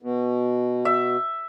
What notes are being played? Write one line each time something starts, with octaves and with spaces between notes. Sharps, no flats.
B2
E5